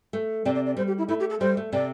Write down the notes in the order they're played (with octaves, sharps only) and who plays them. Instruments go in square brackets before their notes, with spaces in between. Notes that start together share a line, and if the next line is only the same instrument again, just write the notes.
[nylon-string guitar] A3
[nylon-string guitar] C3 C4 [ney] D5
[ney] D5
D5
[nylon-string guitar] G3 [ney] C5
[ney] G4
E4
[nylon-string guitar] A3 [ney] E4
[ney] G4
A4
[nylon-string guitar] G3 [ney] C5
[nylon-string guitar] A3
[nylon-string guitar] C3 C4 [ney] D5